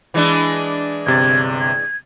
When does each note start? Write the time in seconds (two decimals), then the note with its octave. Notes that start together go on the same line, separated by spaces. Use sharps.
0.14 E3 G#3 D4
1.06 G1 C3 G#6 A6
1.60 G#6